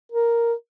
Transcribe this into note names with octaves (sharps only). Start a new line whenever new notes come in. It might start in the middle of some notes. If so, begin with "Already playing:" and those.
A#4